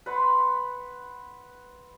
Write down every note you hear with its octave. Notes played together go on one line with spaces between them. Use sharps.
B4 F#5 B5 C6